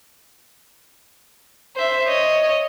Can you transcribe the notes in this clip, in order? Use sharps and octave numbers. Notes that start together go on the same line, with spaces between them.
C5 E5
C#5 D#5